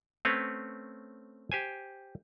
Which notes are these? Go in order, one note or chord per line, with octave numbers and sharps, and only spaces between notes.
A3 C4 C#4 B4 C#5
G4 C5 G#5